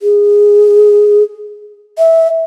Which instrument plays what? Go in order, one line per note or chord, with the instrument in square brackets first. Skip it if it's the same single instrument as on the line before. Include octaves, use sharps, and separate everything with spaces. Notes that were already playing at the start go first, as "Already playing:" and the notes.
[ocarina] G#4
E5